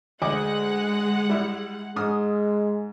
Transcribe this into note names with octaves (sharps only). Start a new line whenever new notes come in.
D2 G#3 D#5 F#5 D6
G3 E4
G#2 G#3 D#6 F6